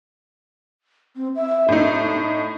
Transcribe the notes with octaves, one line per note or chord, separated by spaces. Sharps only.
C4
E5
A2 D4 D#4